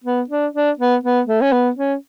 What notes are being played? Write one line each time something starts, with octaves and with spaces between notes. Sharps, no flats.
B3
D4
D4
B3
B3
A3
C#4
B3
C#4